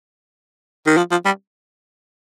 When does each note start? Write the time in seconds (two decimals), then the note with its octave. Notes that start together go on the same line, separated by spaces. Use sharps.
0.86 D#3
0.97 F3
1.11 F3
1.25 G3